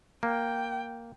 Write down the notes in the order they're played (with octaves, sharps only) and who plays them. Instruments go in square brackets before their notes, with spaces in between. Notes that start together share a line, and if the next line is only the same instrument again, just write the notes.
[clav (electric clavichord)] A#3 [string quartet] G5